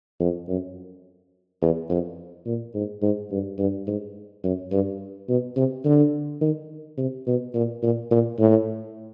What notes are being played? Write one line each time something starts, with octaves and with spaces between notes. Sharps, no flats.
F2
F#2
E2
F2
A#2
G#2
G#2
G2
G2
G#2
F#2
G2
B2
C3
D3
D#3
C3
B2
A#2
A#2
A#2
A2